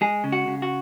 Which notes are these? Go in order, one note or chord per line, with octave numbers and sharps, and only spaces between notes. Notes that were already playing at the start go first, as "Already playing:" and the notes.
G#3 G#4
C#3
F#4
C#3
F#4